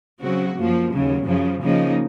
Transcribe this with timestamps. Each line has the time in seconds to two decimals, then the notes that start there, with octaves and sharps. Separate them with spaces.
0.21 C#3 F#3 C4 F#4
0.57 F#2 F3 A#3
0.91 D#2 C#3 F#3
1.27 F#2 C#3 F3
1.61 C#3 F3 A#3 D#4